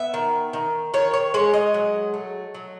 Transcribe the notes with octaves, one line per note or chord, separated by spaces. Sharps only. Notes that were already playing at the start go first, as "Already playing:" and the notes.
Already playing: B3 E5
D#3
D#3
D#3 C#5
C#5
G#3 C#5
D#5
F#3
A3
F#3